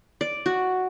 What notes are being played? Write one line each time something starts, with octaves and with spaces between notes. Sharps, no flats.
D5
F#4